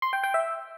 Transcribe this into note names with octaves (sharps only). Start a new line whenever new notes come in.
C6
G5
G5
E5